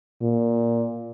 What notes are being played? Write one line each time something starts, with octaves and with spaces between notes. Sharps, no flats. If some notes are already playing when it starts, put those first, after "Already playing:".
A#2